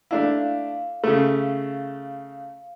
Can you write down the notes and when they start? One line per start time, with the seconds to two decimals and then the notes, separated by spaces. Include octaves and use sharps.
0.11 A3 D4 E4 F5
1.04 C#3 A3